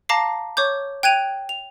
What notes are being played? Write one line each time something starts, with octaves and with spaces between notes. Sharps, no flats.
F5 A5 A#5 D6 A#6 C7
C#5 C#6 D6 G6
G5 F#6 G#6 D7 D#7 F7
F7